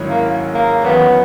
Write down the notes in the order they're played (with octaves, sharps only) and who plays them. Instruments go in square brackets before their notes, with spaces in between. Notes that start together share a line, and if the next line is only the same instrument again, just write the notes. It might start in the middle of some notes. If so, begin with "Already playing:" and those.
Already playing: [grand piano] G#2 D#3 F#3 C#4 E4
[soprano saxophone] A#3
A#3
[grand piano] E2 D#3 F#3 C#4 [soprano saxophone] B3